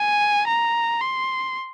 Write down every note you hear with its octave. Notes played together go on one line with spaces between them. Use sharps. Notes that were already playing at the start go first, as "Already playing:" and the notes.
Already playing: G#5
A#5
C6